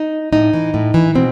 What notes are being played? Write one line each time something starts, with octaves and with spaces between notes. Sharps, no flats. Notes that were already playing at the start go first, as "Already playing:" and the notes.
Already playing: D#4
A2 D#4
E3
A2
E3
B2 C4